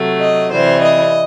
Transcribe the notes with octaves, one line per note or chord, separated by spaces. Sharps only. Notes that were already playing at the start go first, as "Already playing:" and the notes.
Already playing: C3 F#3 A3
D#5
C3 E3 G3 C5
D#5